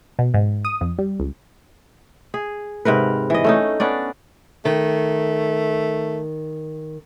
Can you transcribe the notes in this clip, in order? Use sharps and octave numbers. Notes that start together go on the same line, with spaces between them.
B2
G#2
D#6
F2
G3
C#2
G#4
G#2 C3 A#4 B4
E3 D#5
A3 C#4 D#4
B3 C#4 D4 D5
D#3 A3